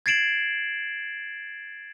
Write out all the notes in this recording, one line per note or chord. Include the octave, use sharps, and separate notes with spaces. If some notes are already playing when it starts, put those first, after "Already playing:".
G#6 A6 C7 D7 E7 F#7